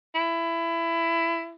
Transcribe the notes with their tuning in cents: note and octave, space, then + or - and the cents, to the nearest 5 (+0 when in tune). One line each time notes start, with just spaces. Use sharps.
E4 +20